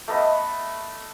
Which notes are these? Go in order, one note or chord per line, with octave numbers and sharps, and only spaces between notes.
A3 B3 D#5 B5